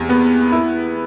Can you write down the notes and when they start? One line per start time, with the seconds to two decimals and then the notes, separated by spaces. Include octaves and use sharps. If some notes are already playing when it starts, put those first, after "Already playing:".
Already playing: E2 C3
0.09 B3
0.52 E4